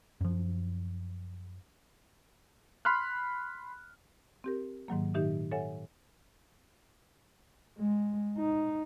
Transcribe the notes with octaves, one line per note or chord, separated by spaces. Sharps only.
F#2 F3
B5 C6 F6 F#6
C4 G4 A#4
G#2 D#3 F#3 A#3
A#2 D#3 D#4 G4 E5 D#6
A4 C#5 E5 F#5 G#5
G#3
D#4